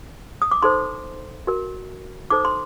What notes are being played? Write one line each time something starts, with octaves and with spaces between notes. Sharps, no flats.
D#6
D6
D#4 A4 C5 C6
F#4 A#4
D#4 A4 C5 D6
C6